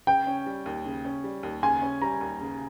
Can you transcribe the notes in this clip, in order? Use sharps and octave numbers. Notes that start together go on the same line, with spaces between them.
C#3 G5
C#4
G3
D#2
C#3
C#4
G3
D#2
C#3 G#5
C#4
G3 A#5
D#2
C#3